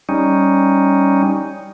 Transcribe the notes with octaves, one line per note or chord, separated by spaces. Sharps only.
G3 C#4 D#4